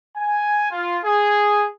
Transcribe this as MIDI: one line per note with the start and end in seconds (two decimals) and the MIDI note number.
0.16 0.66 80
0.72 0.98 65
1.04 1.66 68